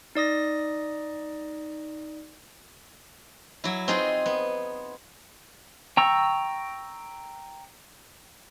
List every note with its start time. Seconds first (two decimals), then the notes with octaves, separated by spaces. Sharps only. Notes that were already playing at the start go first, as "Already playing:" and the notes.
0.15 D#4 D5 D#6 A#6
3.64 F#3 E4
3.88 C4 D#4 F4 G#4
4.26 B3
5.97 G5 A#5 C#6 E6